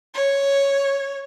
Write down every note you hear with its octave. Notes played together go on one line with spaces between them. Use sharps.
C#5